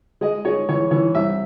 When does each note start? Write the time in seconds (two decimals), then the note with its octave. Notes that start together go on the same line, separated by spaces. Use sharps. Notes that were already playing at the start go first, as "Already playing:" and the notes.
0.21 G#3 D#5
0.45 G#3 C#5
0.69 E3 C#5
0.91 E3 C#5
1.15 C2 E5